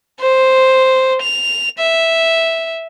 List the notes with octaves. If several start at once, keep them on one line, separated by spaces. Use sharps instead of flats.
C5
F7
E5